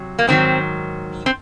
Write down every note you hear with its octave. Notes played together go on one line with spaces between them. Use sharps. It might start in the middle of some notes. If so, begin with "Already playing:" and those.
Already playing: C3 F#3
A#3
G#2 D#3 F#3 C4
C4